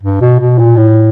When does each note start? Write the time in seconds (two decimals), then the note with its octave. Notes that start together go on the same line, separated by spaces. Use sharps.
0.03 G2
0.22 B2
0.40 B2
0.59 A#2
0.77 A2